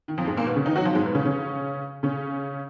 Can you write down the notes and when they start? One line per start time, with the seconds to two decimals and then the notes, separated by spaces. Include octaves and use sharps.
0.08 D#3
0.18 F2 F3
0.27 G#2 G#3
0.37 A#2 A#3
0.46 B2 B3
0.56 C#3 C#4
0.66 D#3 D#4
0.76 F#3 F#4
0.85 F3 F4
0.95 G#2 G#3
1.06 B2 B3
1.15 C#3 C#4
1.25 C#3 C#4
2.03 C#3 C#4